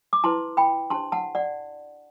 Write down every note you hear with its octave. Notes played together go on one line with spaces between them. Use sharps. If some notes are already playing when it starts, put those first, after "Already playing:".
D6
E4 B4 A5 C6
G5 B5
D4 G4 C5 A5 C6
F#5 A5
D5 F#5